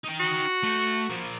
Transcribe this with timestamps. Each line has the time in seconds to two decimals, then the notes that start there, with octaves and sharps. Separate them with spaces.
0.04 D#4 G5
0.20 F#4
0.63 A3
1.10 F3 A#3